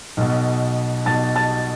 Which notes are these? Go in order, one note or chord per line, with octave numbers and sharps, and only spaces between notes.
B1 B2
B1 B2 A5 A6
A5 A6